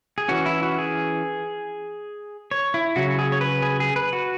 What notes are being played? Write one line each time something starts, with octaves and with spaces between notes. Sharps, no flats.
G#4
E3 C#4 F#4
E4
F#4
G#4
C#5
E4
C#3 F#3 C#4 F#4
G#4
C#5
B4
G#4
G#4
B4
F#4